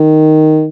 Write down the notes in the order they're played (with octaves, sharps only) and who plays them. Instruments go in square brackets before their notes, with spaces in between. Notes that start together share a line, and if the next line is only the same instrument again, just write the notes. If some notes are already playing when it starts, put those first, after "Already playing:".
Already playing: [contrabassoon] D#3